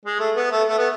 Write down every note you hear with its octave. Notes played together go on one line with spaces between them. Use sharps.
G#3
A3
B3
A3
A3
B3